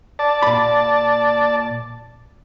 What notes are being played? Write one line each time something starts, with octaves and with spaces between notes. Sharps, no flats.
D5 A5
A#2 B5